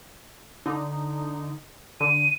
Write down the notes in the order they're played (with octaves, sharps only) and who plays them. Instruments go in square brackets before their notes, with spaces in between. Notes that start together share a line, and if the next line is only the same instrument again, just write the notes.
[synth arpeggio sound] D3 D#4
[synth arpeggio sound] D3 [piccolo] D#7